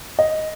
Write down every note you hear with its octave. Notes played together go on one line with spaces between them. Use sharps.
D#5